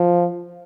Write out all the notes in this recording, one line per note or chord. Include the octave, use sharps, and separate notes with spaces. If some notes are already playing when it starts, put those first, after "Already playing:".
Already playing: F3